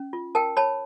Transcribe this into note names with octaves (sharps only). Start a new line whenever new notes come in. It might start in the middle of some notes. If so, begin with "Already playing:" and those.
Already playing: C#4
F4
A#4 G5 A5
C#5 A5 B5